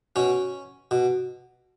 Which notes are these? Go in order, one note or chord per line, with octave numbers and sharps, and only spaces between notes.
B2 C#4
B2